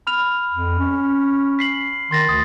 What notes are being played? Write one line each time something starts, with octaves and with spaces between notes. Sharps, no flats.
B5 F6 F7
F2
C#4
B6 C7 F#7
D#3 C6 A6 A#6
D2 D#6